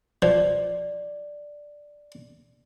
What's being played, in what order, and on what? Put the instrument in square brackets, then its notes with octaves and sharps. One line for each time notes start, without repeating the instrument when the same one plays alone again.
[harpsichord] F3 [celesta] D5